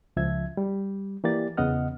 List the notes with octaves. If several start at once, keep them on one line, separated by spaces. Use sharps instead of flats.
C#2 F3 E5 G#6
G3
E3 A#3 G4 D5 A6
E2 C#3 B3 D#5 F#5 F6